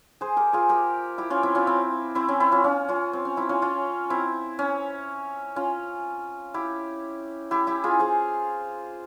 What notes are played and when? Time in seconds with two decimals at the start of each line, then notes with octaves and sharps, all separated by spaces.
0.21 G#4 C5
0.37 G4 A#4
0.53 F4 G#4
0.69 G4 A#4
1.18 E4 G4
1.30 C#4 F4
1.43 C4 E4
1.55 C#4 F4
1.67 C4 E4
2.15 C4 E4
2.28 C#4
2.40 C4 E4
2.52 C#4 F4
2.64 C#4 F4
2.88 C#4 F4
3.13 C4
3.25 C#4
3.37 C4 E4
3.49 C#4 F4
3.62 C#4 F4
4.10 C4 E4
4.59 C#4
5.56 C#4 F4
6.54 E4 G4
7.51 E4 G4
7.67 E4 G4
7.84 F4 G#4
8.00 G#4 C5